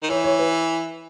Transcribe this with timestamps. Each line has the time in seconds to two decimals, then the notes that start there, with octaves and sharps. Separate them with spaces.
0.03 D#3
0.09 E3 C#5
0.24 C#5
0.39 B4